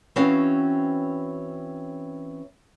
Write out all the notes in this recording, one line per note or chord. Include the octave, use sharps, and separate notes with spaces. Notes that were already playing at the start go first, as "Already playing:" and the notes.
E3 C4 C#4 F#4 D#5 F5